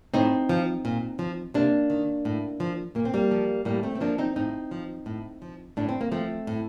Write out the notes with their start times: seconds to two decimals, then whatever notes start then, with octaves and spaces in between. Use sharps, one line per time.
0.14 A2 C4 D#4
0.49 F3
0.85 A#2
1.19 F3
1.54 C3 A#3 D4
1.90 D#3
2.25 A2
2.60 F3
2.95 A#2 A#3
3.05 C4
3.14 G3 A#3
3.31 F3
3.65 A2 G3 A#3
3.83 A3 C4
3.95 C4
4.01 F3 A#3 D4
4.18 C4 D#4
4.36 A2 C4 D#4
4.71 F3
5.06 A2
5.42 F3
5.77 A2 D4
5.89 C4
6.01 A#3
6.12 F3 A3 C4
6.47 A2